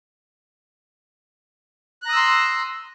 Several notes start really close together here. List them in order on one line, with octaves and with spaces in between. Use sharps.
F#6 A#5 D#6 E6 C6